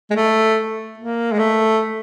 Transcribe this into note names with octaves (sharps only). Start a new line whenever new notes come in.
G#3
A3
A#3
G#3
A3